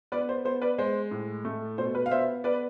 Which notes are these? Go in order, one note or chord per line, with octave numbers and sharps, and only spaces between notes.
B3 B4 D5
C5
B3 C5
B4 D5
G#3 C5
A2
A3
B2 C5
B4
F5
B3 C5 E5
B3 B4 D5